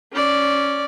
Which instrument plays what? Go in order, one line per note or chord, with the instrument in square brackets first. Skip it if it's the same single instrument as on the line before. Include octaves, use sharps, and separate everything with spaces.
[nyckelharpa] C#4 D5